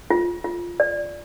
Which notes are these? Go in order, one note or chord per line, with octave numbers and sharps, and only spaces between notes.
F4
F4
D5